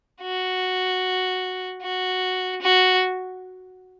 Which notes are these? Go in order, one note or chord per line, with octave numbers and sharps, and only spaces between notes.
F#4
F#4
F#4